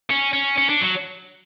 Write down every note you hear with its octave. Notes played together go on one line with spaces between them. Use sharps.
C#4
C#4
C#4
D4
F#3